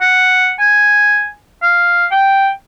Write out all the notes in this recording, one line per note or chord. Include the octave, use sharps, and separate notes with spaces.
F#5
G#5
F5
G5